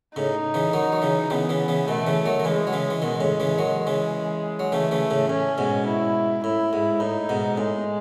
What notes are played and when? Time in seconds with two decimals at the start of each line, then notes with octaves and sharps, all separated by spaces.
0.16 A2 C#3 D#4
0.54 C#3 E3
0.73 D#3 F#3
0.92 F#3
1.02 C#3 E3
1.30 C#3 E3 B3
1.49 C#3 E3
1.68 C#3 E3
1.88 B2 D#3 A3
2.07 C#3 E3
2.26 D#3 F#3
2.40 D#3
2.45 C#3 E3 G#3
2.67 F#3
2.73 C#3 E3
2.90 E3
3.02 B2 D#3 G#3
3.20 A2 C#3
3.40 C#3 E3
3.58 D#3 F#3
3.87 C#3 E3
4.59 F#3
4.72 C#3 E3 A3
4.91 C#3 E3
5.10 A2 C#3
5.29 A2 C#4
5.58 G#2 B2
5.86 E4
6.44 A2 E4
6.73 G#2
7.00 A2 D#4
7.29 G#2 B2
7.57 A2 G#3